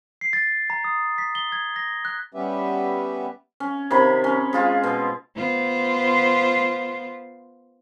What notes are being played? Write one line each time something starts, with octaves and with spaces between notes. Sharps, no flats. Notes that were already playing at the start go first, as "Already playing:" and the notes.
C7
A6
A#5
D#6
B6
G7
G#6
A#6
F#6
G3 B3 C#4 G4 B4 E5
C#4
C3 D#3 C#5 B5
C#4
G#3 F4 G#4
B2
B3 F4 C5